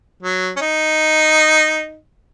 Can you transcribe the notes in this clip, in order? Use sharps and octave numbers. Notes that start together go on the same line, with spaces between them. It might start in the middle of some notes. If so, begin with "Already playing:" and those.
F#3
C#4
D#4